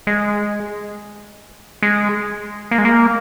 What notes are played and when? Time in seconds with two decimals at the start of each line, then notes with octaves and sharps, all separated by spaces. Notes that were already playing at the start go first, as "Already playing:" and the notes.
0.07 G#3
1.82 G#3
2.71 A#3
2.78 G#3
2.85 A#3